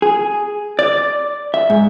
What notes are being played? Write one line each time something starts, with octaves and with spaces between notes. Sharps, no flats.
G#4
D5
E5
G#2